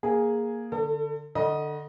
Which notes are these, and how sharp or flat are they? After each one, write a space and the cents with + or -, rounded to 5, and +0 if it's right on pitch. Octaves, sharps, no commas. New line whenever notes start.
A#3 +0 G#4 +0
D3 +0 A4 +40
D3 +20 D#5 +0 B5 -45